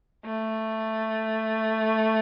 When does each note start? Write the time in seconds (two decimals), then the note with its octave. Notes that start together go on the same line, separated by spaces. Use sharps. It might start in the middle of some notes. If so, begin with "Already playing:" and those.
0.25 A3